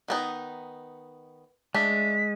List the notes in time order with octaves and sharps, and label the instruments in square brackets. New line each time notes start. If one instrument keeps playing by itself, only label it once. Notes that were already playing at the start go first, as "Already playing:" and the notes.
[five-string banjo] D#3 B3 D#4
[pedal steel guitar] G#3 [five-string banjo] A3 D4 [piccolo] B6